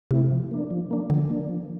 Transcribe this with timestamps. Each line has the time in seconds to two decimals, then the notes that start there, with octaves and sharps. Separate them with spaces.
0.11 C3 A3 C4 E4
0.32 F3
0.51 A#3 D4
0.71 F3
0.91 A#3 D4
1.10 D3 F3
1.30 A#3 D4
1.49 F3